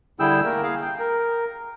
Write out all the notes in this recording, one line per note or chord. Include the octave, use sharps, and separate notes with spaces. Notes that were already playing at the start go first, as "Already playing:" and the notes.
D3 G3 E4 G#4 G5 E6
A3 A#3 A#4
G#4 F5
G5
A#4